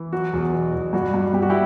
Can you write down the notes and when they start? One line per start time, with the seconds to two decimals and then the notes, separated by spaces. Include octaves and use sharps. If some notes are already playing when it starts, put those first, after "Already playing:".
Already playing: E3
0.13 F#3 F#4
0.33 E2
0.53 B2
0.73 E2
0.93 G2 F#4
1.14 G2
1.33 G2 G4
1.42 F#4
1.50 E4 G4